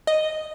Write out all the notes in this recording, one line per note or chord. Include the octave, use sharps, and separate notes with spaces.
D#5